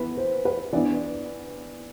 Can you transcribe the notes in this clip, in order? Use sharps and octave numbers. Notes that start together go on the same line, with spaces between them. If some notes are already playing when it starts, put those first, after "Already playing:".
Already playing: E3 B3 E4 B4
C5
B4
E3 B3 D4 D5